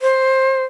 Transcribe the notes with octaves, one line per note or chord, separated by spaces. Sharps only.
C5